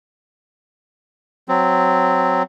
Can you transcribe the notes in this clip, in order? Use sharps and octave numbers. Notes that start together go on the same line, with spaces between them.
F#3 C4